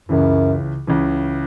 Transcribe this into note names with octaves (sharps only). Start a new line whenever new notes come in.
C#2 F#2 C#3 E3
C#2 C#3 E3